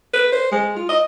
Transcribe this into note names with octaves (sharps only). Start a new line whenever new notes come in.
B4
C5
G#3
F4
D#5